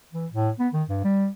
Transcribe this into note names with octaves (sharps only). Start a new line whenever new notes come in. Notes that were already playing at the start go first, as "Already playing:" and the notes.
E3
A2
B3
D#3
G2
G3